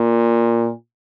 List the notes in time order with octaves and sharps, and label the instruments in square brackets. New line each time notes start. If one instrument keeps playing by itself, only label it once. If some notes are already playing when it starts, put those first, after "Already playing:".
Already playing: [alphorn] A#2